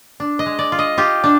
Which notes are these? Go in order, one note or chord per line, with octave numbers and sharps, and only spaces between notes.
D4
D#5
G#3
D5
F4
D#5
F4 G4
D4